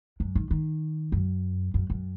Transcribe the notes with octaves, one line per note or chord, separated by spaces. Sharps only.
F#2
D#3
D#3
F#2
F#2
F#2